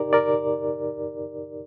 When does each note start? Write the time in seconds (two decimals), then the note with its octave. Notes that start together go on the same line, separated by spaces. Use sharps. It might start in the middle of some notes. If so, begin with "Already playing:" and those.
Already playing: D#4 G4 A#4 D5
0.13 A#4 D5